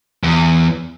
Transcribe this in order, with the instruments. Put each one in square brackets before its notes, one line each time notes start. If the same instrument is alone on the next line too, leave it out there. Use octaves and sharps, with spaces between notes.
[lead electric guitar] E2